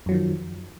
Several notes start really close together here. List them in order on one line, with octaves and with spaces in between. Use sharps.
F#2 F#3 F3 D#3